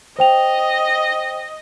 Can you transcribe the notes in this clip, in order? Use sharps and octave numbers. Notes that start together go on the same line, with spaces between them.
C5 D#5 G5 F7